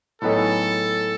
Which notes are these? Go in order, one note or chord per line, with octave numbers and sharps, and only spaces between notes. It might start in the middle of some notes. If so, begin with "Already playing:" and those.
A2 F#3 B3 D#4 G#4 A4